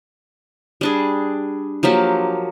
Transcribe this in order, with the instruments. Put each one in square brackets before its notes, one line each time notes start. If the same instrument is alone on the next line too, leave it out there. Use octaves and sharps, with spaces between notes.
[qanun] G3 D4 G#4
F3 F#3 A#3 G4